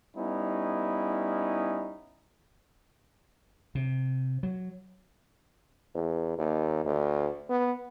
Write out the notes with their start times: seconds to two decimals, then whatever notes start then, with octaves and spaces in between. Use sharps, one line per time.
0.16 G3 B3 C#4 D#4 E4
3.75 C3
4.43 F#3
5.95 E2
6.38 D#2
6.85 D2
7.50 B3